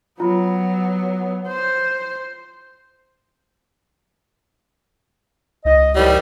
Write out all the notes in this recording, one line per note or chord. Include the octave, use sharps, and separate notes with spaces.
F#3 B3 F4 B5
C5
C#2 D#5
D#2 A2 F3 G3